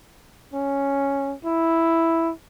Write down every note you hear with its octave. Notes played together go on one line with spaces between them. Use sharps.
C#4
E4